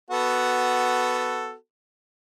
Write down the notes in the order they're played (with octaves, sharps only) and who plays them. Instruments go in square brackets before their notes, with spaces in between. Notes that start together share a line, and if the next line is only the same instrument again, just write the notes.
[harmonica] B3 F#4 A4